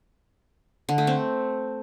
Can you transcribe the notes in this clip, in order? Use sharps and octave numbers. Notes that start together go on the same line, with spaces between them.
D3
A3
C4